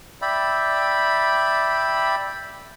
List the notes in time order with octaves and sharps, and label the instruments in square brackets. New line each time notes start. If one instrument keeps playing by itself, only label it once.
[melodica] D5 E5 G5 B5